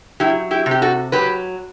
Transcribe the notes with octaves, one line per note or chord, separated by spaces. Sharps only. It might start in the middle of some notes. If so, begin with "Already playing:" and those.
F#3 E4 G4
E4 G4
C3
G4
F#4 A4
F#3 G4 B4